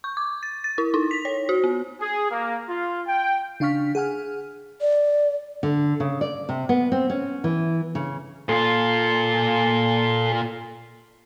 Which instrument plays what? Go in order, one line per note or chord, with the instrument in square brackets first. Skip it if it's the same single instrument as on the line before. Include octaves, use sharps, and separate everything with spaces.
[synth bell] C#6
D6
A6
A6
E4
D#4
B6
C#5
F#4
B3
[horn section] G#4
A#3
F4
G5
[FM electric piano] C#3 D4 F5 C#6 F6 B6
G#4 F#5 G#5 F6
[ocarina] D5
[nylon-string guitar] D3
C#3
D5
C3
B3
C4
C#4
E3
C#3
[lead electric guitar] A#2 F4 [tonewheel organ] A4 C6